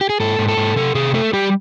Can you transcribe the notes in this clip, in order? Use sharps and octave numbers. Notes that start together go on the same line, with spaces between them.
G4
G#4
G#2 A4
G#2
A4
G#2
C3 A4
C3 G#4
A3 A4
G3 G4